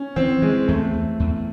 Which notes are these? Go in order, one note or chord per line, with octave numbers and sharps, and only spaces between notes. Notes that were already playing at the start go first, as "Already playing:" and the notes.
Already playing: C#4
E3 C4
E3 G#3
E2 A3
E2
E2